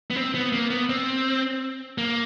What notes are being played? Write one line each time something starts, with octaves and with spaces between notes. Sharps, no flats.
B3
C4
B3
A#3
B3
C4
A#3